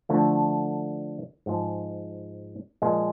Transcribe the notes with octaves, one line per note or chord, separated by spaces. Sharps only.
D3 F3 A3
G#2 F3 G#3
A#2 F3 G#3